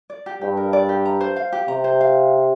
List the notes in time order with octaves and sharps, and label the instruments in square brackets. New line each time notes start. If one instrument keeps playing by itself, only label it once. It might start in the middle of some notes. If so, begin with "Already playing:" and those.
[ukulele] D5
G4
[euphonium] G2 [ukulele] G4
[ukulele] A#4
D5
G4
A#5
C5
F5
G4
[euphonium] C3 [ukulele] A#5
[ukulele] C5
F5